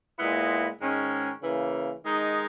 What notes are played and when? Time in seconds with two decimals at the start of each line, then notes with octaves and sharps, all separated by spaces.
0.18 A#2 G#3 B3 E4
0.81 G#2 D#3 G#3 C#4
1.42 C#3 E3 A#3
2.04 D#3 G#3 D#4